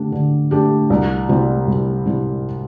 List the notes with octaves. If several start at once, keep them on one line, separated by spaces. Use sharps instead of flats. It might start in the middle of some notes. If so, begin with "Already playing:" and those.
Already playing: D3 A3 D4 G4
D3
A3 D4 G4
C2
C3 G3 C4 E4
C2
C3 G3 C4 E4